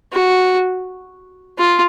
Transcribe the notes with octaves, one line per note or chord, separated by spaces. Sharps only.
F#4
F4